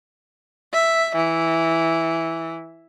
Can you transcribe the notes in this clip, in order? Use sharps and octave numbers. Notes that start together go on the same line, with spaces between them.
E5
E3